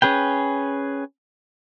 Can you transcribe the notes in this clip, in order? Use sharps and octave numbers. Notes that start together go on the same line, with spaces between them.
C#4 G#4 B4 G5